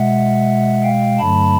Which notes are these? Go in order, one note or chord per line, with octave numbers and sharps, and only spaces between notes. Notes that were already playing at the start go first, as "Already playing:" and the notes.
Already playing: B2 G#3 E5 F#5
F5 G5
G2 D3 F#3 A3 A5 B5